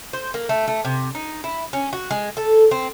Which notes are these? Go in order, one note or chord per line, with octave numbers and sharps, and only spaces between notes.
C5
A#3
A3
A3
C3
D#4
E4
C#4
F#4
G#3
A4
C4